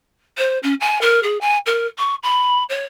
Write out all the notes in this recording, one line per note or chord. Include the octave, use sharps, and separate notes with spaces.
C5
C#4
G#5
A#4
G#4
G#5
A#4
C#6
B5
C#5